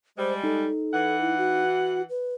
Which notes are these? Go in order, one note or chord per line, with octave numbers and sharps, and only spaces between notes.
G3 G#3 C5
D#4 A4
E3 F#5
E4
F#4
B4